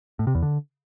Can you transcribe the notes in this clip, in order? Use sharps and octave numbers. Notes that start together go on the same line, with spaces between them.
A2
C3
E2
D3